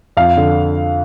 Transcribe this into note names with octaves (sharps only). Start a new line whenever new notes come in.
F2 F5
D3